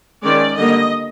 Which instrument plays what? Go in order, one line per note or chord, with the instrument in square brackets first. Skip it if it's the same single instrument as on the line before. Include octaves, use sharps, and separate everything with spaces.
[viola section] D#3 G#3 C#4 D5
D3 G3 A#3 D#5